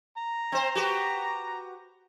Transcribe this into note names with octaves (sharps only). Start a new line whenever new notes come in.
A#5
C4 C5
F#4 G4 B4